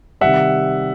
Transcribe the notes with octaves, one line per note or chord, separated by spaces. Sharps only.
C3 D#3 G3 E5 F#5